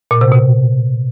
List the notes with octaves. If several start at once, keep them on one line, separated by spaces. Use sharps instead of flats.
A#2
C3
B2